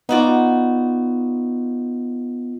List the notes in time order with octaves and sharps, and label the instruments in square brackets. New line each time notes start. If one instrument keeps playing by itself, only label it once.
[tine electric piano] B3 F4 [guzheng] D#4 F#4 D5